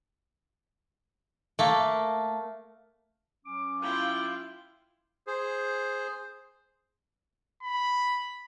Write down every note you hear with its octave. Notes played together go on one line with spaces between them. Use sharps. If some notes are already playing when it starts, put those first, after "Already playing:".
A3 A#3
F#3 C#4 D6
E4 F4 G5
G#4 C5
B5